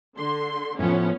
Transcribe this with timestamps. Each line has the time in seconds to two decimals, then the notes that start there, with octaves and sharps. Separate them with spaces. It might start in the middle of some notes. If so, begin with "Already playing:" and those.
0.18 D3 C6
0.79 A2 F3 B3 C#4